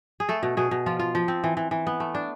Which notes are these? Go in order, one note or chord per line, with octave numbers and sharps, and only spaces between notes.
G#4
A3 A4
B2
B2 G#4
B2
F3 F4
F4
F3
C4
E3
E3
E3
B3
A3
D4